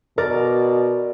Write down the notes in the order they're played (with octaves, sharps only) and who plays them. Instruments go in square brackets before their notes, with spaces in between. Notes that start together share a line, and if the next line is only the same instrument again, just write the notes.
[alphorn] B2 [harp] A#4 D5